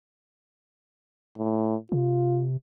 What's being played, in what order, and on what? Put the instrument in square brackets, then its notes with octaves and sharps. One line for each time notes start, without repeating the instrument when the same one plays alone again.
[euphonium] A2
[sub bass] C3 [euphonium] F4